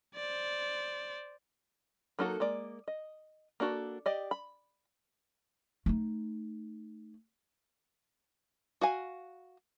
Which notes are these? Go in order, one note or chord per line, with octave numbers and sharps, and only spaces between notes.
C5 D5
F#3 A#3 D#4 F#4 A4
G#3 A#3 D5
D#5
A#3 D4 F#4 A4
G4 D5 D#5
B5
A3 D#4
F#4 F5 G#5